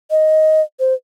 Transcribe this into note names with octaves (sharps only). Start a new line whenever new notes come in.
D#5
C5